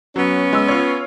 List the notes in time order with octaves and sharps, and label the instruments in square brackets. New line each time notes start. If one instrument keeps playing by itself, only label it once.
[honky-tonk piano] F#3 [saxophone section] B3 C#4
[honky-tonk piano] G#3 E6
F4 C#5